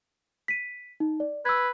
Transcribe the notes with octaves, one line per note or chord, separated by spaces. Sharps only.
B6 D#7
D#4
D5
B4 E6 G#6